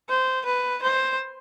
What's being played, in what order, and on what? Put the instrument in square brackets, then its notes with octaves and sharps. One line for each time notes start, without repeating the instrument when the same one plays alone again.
[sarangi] C5
B4
C5